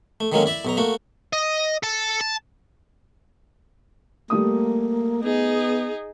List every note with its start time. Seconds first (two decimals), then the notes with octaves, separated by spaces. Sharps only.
0.20 A3
0.32 D3 D#3 F#3 G#3 A#3 C#4
0.46 E4 D5 E5
0.65 B1 B2 A#5
0.77 A3 A#3 F#4
1.33 D#5
1.83 A4 A5
2.21 A5
4.30 G3 A3 A#3 D#6
5.23 B3 D#4 G#4